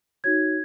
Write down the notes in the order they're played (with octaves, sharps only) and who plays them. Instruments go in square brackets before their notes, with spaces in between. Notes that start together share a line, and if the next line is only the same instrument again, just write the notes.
[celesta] D#4 F#4 C#5 G#6